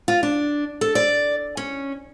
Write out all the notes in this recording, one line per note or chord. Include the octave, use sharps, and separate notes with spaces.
F4
D4
A4
D5
C#4